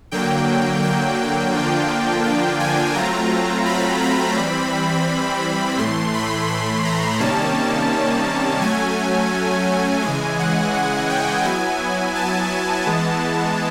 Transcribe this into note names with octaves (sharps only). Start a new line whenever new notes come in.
D3 F#3 A#3 G5
G5
D3 F3 A#3 D4 F4
G5
G#5
F#3 A3 C4 F4 A#5
B5
B5
E3 G3 C4
A2 E3 A3 C6
B5
B5
A#5
C3 D#3 G3 A#3 C#4 A5
F#3 A3 C#4 G#5
C#3 E3 G#3 G#5
F#5
F#5
G5
F#3 B3 E4 G#5
A5
E3 G#3 B3